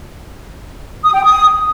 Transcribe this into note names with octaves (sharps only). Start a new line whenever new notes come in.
D#6
G5
D#6